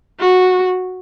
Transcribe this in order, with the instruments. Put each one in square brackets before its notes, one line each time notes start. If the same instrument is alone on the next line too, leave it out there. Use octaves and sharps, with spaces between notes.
[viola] F#4